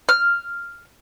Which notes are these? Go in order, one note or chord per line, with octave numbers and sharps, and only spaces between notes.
F6